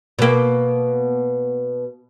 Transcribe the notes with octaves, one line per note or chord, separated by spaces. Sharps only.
B2 A#3